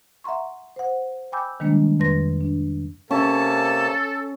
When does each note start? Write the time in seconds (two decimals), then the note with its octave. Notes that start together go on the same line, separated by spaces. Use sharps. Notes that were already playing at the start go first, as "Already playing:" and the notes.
0.24 E5 F#5 A#5 C6 C#6
0.76 C5 F#5
1.32 G5 G#5 B5 D6 E6 G6
1.60 C3 D#3 G3 G#3 A#3 D4
1.99 F2 D#3 B4 C6 A#6
2.41 D4
3.11 C3 A#3 C#4 A4 A5